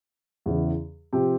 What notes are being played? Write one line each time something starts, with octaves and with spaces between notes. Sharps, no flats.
E2 C#3 E3
C3 F3 C4 G4